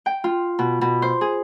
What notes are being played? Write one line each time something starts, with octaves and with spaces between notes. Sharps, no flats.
G5
F4
B2
B2
C5
G#4